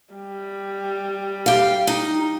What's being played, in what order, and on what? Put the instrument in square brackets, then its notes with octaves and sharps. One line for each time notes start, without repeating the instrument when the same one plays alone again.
[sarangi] G3
[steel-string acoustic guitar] G4 F5
D#4